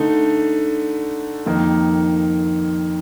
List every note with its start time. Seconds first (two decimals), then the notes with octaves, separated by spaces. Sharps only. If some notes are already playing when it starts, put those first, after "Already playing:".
Already playing: D3 A3 D#4
1.46 F2 D#3 A#3 D#4